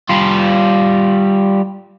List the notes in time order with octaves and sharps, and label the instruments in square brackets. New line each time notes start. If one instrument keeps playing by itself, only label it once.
[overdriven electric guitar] G3 F4